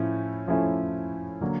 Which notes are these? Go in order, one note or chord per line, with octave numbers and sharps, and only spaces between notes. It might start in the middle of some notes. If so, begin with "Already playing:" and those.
Already playing: A2 F3 A3 C#4 E4
A2 F3 A3 C#4 E4
D3 F#3 A#3